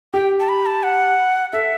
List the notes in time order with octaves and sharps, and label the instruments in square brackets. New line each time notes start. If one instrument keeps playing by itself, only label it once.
[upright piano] G4 [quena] G5
[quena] A5
B5
A5
F#5
[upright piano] A4 [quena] E5